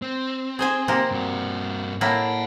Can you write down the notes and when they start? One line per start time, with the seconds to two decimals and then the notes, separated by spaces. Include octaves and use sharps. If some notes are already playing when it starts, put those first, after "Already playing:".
0.02 C4
0.59 G#4 C5 G#5
0.88 C3 A#3 G4
1.11 G2 F#4
2.01 A2 A#3 E4 F#5 A5